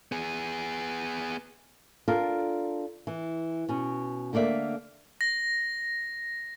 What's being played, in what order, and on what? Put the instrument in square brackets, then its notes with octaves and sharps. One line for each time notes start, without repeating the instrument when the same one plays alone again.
[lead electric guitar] B3 G#4
[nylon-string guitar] D4 F4 A4 A#4
E3
B2 C#4
D3 A3 A#3 D5 E5
[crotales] A#6